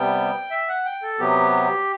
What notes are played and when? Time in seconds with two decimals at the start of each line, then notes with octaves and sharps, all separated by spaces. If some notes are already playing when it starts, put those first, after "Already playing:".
Already playing: C3 G3 B3 G5
0.51 E5
0.69 F#5
0.86 G5
1.03 A4
1.19 C3 F#3 B3 G4